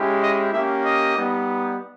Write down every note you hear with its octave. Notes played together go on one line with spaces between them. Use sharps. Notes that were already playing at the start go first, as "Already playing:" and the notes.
Already playing: G#3 C#4 E4 G4
D#5
A#3 C#4 G4 E5
D#5
G3 B3 D#4